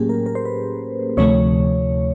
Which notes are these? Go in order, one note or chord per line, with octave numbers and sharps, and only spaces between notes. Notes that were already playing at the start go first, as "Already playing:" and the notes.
Already playing: A2 F#3 A#3 C#4 G4 G#4
A#4
A#4
C5
B4
D2 C3 F3 A3 C#5